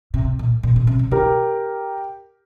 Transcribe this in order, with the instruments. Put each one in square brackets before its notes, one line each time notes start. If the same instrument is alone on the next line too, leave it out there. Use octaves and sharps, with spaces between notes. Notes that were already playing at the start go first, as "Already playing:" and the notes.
[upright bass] C3
A#2
A#2
A#2
C3
C3
[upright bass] D3 [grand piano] G4 A#4